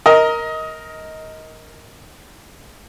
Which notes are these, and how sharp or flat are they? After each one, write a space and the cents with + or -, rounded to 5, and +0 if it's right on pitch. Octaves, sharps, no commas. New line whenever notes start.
A#4 +0 D#5 +20